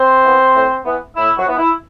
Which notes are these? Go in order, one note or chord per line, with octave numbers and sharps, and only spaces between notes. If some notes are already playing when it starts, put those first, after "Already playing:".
Already playing: C4 C5
E3 B3
A2
E3 B3
A2 E4
F#3 F#4
E3 B3
E4